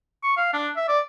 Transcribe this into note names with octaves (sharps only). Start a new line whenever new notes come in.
C#6
F5
D4
E5
D5